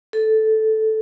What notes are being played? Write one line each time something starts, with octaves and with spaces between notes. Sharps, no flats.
A4